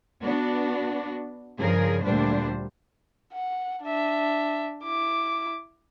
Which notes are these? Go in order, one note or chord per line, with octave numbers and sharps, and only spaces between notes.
B3 D4 F#4
G2 C#3 F3 G#4 A#4
D2 A#2 G3 D4 C5
F#5
D4 E5
E4 D6